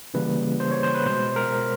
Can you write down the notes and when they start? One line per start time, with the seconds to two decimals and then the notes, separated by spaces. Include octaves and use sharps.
0.14 C#3 E3 G3 A#3 B4
0.60 C5
0.72 C#5
0.83 C5
0.95 B4
1.06 B2 G#3 C5
1.36 A#4